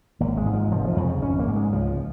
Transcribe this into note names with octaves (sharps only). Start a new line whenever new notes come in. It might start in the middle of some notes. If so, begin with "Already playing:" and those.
G#1 A#3
G#3
G#2
F3
F1 F3
G#3
F3
F2 C#3
G#1 C#4
A#3
G#2
G#3
C#2 F3